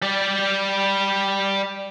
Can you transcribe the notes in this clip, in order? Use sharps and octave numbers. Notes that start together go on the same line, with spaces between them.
G3 D5